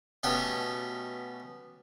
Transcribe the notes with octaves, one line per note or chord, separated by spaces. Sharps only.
B2 A3 B3 C#4 F#4 G4